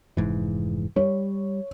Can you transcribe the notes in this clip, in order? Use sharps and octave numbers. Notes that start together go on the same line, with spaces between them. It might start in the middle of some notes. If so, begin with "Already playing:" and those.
F1 G#2 E3
G3 C#5